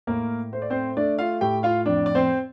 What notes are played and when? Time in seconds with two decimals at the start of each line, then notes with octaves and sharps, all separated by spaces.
0.07 A2 A#3 A#4
0.53 A3 C5
0.62 D5
0.70 C4 C5
0.97 A3 D4 D5
1.18 F4 F5
1.41 A2 G4 G5
1.63 F4 F5
1.86 F2 D4 D5
2.06 D5
2.15 C4 C5